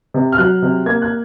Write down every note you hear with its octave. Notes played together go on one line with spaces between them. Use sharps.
C3
F6
F#3 F#6
C3
A#3 G#6
F#6